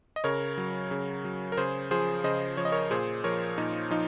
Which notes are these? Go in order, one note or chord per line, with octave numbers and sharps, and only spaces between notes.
D#5
C#3 A#4 C#5
F#3
C#3
F#3
A#4
C#3 G#4 C5
F3 G#4 C5
C#3 C5 D#5
F3 C#5
D#5
A#4 C#5
A#2 G#4 C5
F3 A#4 C#5
A#2 D#4
F3 D#4